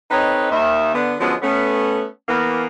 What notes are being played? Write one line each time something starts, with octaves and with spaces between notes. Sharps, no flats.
C4 D#4 A4 B4 C#5 D#5
D#2 D#3 E5
D3 B3
D3 F3 F#3 G#3 B3 C#4
A3 B3 C#4
E3 A#3 B3